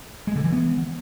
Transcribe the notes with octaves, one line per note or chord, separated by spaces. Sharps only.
G#3
D3
E3
B3